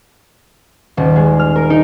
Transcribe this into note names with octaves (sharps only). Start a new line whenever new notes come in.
D#1
G#3
F6
A#4
D#4